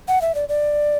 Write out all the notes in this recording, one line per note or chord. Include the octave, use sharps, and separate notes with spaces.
F#5
E5
D5
D5